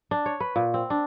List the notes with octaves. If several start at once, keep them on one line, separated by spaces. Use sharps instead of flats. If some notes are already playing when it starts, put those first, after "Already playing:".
D4
C#5
B4
A#2
C4
D4